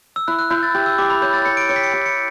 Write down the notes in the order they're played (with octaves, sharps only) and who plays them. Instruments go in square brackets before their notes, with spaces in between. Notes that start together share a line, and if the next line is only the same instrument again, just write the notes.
[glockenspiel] E6
[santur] E4 [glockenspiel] F#6
[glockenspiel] F#6
[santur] E4 [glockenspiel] G6
[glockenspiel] A6
[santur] G4 [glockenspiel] G6
[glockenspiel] E6
[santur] G4 [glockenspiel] D6
[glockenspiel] B5
[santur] C#5 [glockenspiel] G6
[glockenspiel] A6
[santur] C#5 [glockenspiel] C#7
[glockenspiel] D7
[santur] C#5 [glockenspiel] C#7
[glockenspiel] B6
C#7
[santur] G4
[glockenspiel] C#7